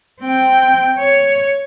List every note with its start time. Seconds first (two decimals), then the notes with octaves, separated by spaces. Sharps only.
0.21 C4 G5
0.99 C#5